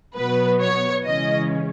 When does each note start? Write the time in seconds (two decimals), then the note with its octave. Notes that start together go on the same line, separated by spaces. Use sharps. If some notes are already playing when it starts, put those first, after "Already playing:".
0.16 B2 F#3 B3 B4
0.60 C#5
1.04 C#3 E3 G#3 C#4 D#5